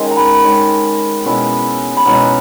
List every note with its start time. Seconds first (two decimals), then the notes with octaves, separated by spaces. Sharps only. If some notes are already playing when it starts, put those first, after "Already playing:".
Already playing: D#3 G#3 C#4
0.11 A#5
0.17 B5
0.44 D#3 G#3 C#4
1.24 B2 G#3 C#4 E4
1.97 B5
2.05 B2 G#3 C#4 E4 A#5